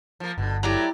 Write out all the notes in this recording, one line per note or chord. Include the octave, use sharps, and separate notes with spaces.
F3 A#3
G1 B2 D3
F#3 A3 E4 G4 D5 A#5